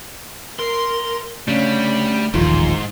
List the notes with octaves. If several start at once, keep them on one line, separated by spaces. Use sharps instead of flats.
A#4 C6
C#3 G3 A3 D4
D#1 A1 G#2 D#3 F3 F4 C6